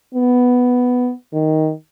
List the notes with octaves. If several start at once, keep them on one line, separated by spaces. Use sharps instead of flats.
B3
D#3